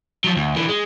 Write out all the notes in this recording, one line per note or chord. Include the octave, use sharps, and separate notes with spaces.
F3 F#3
D2
D3 E3
G#3